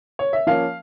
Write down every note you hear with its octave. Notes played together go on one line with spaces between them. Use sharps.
C#5
E5
F3 A#3 C#4 F5